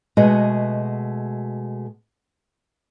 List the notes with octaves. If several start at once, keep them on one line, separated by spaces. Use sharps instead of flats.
B2 G#3 A3 F#4 D#5